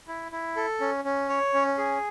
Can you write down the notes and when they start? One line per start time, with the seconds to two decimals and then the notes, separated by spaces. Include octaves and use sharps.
0.08 E4
0.32 E4
0.56 A4
0.80 C#4
1.05 C#4
1.29 C#5
1.54 C#4
1.78 G#4